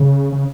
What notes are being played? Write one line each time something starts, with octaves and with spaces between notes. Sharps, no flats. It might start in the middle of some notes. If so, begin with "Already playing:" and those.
Already playing: C#3
C#3